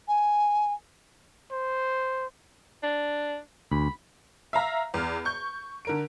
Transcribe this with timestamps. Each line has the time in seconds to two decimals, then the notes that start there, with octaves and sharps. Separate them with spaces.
0.08 G#5
1.52 C5
2.83 D4
3.72 D2 B5
4.53 E5 F5 A#5 F6
4.94 E2 F6
5.25 C#6 G6
5.85 D3 A#4 D7